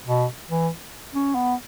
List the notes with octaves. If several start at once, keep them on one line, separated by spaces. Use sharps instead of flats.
B2
E3
C#4
B3